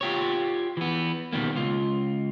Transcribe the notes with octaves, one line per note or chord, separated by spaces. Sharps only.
F4 G4 C#5
E3 B3
B2 D#3 G3 A#3
C#2 F4